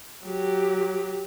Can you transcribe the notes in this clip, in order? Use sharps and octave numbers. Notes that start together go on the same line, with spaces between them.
F#3 G4